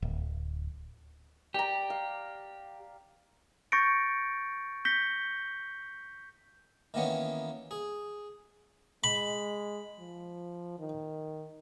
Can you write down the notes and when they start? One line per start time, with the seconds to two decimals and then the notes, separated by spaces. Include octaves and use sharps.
0.02 D1
1.54 G4 D5 A#5
1.90 F5
3.72 C#6 G6 A6 A#6 C#7 D7
4.85 G6 A#6 B6 C#7 G7
6.94 D#3 E3 A#3 B3 C#4
7.71 G#4
9.04 G#3 B5
9.99 F3
10.79 D#3